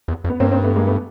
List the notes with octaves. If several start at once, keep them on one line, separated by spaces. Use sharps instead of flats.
E2
F2
B3
G2 A#3 C4
A#3 C4
A3 B3
G#3 A#3
A3 B3